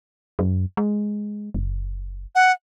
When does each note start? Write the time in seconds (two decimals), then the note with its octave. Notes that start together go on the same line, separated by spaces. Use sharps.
0.39 F#2
0.77 G#3
1.54 F#1
2.35 F#5